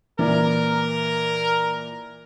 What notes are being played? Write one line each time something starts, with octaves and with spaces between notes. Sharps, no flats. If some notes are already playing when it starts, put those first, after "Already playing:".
A#2 E3 A#4 D5